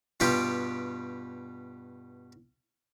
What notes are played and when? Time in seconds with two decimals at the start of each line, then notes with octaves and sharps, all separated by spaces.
0.20 G2 B2 G3 F4 G4